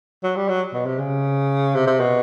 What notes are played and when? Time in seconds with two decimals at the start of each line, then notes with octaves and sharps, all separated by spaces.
0.23 F#3
0.36 G3
0.49 F#3
0.74 B2
0.86 C3
0.99 C#3
1.75 C3
1.87 C3
2.00 B2